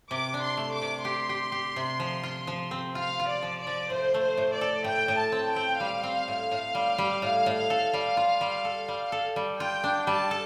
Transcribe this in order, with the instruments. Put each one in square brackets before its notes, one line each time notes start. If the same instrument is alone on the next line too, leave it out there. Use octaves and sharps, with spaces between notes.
[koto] C3 [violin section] D6
[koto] D4
[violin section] C6
[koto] A3
[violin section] D6
[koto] C3
[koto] G4 [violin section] C6
[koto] G4
G4
C3
F3
F4
F3
C4
[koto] F4 [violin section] F5
[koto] F4
[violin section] D5
[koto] F3
[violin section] D5
[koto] F3
[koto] A2 [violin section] C5
[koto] A3
[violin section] C5
[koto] A2
[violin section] D5
[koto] A4
[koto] A2 [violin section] G5
[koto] A2
[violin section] A5
[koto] C4
[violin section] G5
[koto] C4
[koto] G3 [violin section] F5
[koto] C4
A2
A2
G3
G3
A2
A2
A4
G3
F4
G3
A4
G3
A4
G3
[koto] F4 [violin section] G5
[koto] D4
[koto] G3 [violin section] A5
[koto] A4